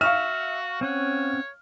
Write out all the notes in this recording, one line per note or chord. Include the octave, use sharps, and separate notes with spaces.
F#4 E5 F5 C#6 F6
C4 C#4 C#5 F#5